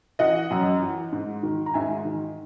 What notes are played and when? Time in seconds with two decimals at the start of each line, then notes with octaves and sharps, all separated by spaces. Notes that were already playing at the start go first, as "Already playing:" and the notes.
0.19 E3 D#5 F#5
0.51 F#2
0.82 E3
1.13 G#2
1.43 D#3
1.66 A#5
1.74 G#2 E5 G#5
2.05 D#3